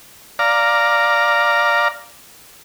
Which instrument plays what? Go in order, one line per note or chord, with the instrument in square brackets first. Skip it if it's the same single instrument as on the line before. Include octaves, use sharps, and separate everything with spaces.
[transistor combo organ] D5 F5 A#5